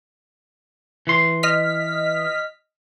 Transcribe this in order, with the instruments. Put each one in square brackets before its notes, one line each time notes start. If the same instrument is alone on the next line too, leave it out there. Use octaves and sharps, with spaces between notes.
[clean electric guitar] E3 C6
[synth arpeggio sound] D#5 F6 B6